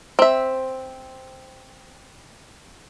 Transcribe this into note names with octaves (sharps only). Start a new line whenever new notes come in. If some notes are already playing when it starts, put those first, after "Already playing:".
C4 E5